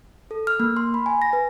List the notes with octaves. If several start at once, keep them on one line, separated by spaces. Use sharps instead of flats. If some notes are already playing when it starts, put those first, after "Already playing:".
A4
F6
A#3
C6
B5
G#5
A#6
B4